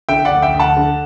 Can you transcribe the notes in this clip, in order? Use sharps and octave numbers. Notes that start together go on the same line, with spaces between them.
D3 E5 G5
D5 F#5
D2
E5 G5
D2
F#5 A5
D3